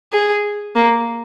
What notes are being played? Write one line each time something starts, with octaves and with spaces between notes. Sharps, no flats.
G#4
A#3